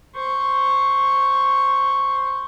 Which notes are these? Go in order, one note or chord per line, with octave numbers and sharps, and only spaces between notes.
C5 C#6